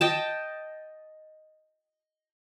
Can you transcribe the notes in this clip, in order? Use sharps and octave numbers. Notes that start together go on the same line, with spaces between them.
D#5 G5 A5